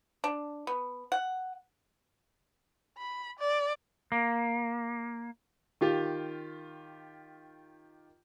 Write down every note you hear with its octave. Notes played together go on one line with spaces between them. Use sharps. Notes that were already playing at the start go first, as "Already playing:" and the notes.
D4
B3
F#5
B5
D5
A#3
D#3 F4 G4